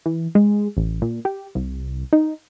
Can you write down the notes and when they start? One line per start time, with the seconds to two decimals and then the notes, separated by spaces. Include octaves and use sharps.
0.06 E3
0.35 G#3
0.77 A1
1.02 A#2
1.25 G4
1.55 C2
2.13 D#4